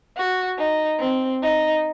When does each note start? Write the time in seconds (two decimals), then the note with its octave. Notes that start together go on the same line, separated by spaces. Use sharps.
0.17 F#4
0.58 D#4
1.00 C4
1.41 D#4